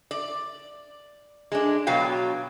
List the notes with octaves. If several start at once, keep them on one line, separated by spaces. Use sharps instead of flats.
D5
G#3 D4
B2 F#3 F5 G5